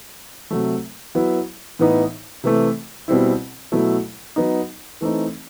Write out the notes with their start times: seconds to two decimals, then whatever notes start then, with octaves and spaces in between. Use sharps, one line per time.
0.51 C3 F#3 A3
1.15 F#3 B3 E4
1.79 A2 E3 B3 D#4
2.44 C3 E3 A3
3.08 B2 G3 C4 E4
3.72 B2 F#3 A3 E4
4.36 F#3 B3 D#4
5.01 E3 A3 C4 D#4